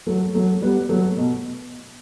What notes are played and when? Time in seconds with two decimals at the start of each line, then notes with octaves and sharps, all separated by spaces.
0.07 F#3 A3
0.34 F#3 A3
0.62 G3 B3
0.89 F#3 A3
1.17 B2